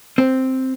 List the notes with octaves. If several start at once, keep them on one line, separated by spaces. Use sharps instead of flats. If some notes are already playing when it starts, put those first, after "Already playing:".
C4